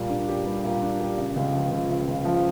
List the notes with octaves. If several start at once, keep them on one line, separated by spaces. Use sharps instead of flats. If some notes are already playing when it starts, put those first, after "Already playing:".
Already playing: A#2 G3
D4
G4
G3
A#2
D4
G4
C#3
C#2
F3
C#2
C#3
C#2
F3